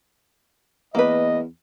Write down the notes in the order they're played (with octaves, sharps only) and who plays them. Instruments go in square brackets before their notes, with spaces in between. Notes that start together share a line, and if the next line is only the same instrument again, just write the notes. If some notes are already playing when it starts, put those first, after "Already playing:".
[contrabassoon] E2 [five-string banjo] A#3 B4 [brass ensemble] D#5